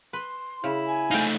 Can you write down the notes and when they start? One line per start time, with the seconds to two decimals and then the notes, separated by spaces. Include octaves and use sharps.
0.13 B4 C6
0.64 C#3 E4
0.86 G#5
1.11 A3 D#4 F5 G5